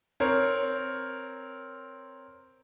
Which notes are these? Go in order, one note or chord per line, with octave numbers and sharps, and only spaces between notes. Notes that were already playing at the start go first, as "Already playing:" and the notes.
C4 A#4 C#5